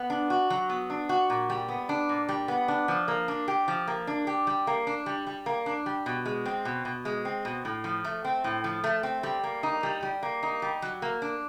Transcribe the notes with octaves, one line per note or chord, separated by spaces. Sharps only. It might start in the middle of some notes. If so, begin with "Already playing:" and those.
Already playing: B3
D4
F#4
F#3
B3
D4
F#4
A#2
G3
B3
D4
A#2
G3
B3
D4
F3
A#3
D4
G4
F3
A#3
D4
G4
G3
A#3
D4
G3
G3
A#3
D4
G3
B2
G#3
C4
B2
B2
G#3
C4
B2
A2
F3
A3
C4
A2
F3
A3
C4
G3
A#3
D#4
G3
G3
A#3
D#4
G3
F#3
A#3
D4